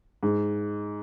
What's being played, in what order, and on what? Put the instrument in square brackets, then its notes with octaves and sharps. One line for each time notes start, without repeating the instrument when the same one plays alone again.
[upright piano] G#2